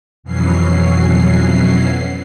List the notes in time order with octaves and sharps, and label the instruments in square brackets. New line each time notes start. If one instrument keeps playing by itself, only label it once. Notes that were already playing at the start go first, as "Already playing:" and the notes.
[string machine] F2 B2 E3 F#3 C#4 C7